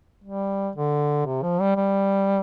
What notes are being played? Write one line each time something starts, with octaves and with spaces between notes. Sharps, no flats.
G3
D3
C3
F3
G3
G3